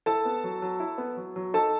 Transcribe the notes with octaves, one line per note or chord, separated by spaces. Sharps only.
E4 A4 A5
B3
F#3
F#3
E4
B3
F#3
F#3
D#4 A4 A5